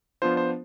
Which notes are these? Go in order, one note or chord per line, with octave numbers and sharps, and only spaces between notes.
F3 B3 D4 F4 C5
C5